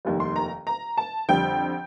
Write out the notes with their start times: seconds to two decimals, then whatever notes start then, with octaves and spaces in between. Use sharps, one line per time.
0.05 F1 D#2 D#3 G3
0.20 C6
0.36 A#5
0.67 A#5
0.97 A5
1.29 F2 D3 G3 G5